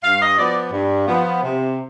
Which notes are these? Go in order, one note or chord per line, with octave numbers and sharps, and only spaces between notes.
G2 F5
D#5
F3 B3 D5
G2
F3 B3
C3